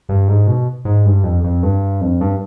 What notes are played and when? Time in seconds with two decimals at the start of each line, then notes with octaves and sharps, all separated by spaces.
0.09 G2
0.28 G#2
0.47 B2
0.85 G#2
1.05 G2
1.24 F2
1.44 F2
1.63 G2
2.01 F2
2.21 G2